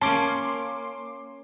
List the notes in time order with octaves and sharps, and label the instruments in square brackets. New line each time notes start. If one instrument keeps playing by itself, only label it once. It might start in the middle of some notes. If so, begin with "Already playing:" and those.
[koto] A#3 C#4 [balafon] A5 [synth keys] C6 D6